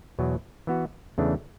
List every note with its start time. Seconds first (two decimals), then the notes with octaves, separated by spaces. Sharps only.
0.19 E2 B2 F#3
0.67 E3 B3 F#4
1.18 E2 C#3 E3 A3 D4